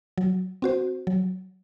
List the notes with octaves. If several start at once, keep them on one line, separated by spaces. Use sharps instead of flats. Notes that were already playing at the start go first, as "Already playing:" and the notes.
F#3
C4 F#4 C5
F#3